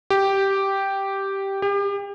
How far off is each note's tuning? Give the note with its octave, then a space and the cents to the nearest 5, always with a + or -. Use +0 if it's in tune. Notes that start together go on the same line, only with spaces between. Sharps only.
G4 -5
G4 +35